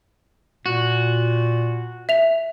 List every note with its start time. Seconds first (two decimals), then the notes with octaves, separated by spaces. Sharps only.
0.66 A#2 F#4
2.09 E5 F7